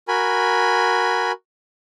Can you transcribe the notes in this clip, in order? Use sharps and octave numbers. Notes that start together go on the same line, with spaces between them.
F#4 A#4 G#5 B5